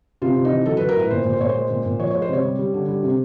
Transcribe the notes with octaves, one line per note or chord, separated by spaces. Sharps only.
C3 F4
C3
D#4
E3
F#3 A4
F#3 B4
A#4
A2 B4
A#2 C5
A#2
C5
A#2 C#5
C5
G#3
A#2
A#2
F3 C#5
G#3 C#5
C5
C3 C#5
G3
G3
D3
G3
C3